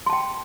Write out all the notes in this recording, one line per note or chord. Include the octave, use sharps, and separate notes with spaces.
G5 A5 C6